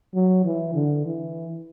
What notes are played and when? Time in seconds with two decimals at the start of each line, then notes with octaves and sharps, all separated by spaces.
0.14 F#3
0.44 E3
0.75 D3
1.06 E3